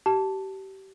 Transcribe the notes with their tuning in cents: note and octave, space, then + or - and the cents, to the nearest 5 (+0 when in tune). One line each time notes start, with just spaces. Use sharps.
G4 -30 A5 +0